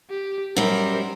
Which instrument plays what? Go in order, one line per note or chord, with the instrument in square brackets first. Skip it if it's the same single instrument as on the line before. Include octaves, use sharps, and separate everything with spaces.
[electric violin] G4
[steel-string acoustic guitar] F#2 G3 [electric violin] A#4 C5